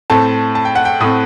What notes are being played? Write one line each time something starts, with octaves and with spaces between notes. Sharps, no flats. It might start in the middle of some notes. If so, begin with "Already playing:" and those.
A2 A3 C4 A5
A5
G5
F#5
G5
A2 A3 C4 D#6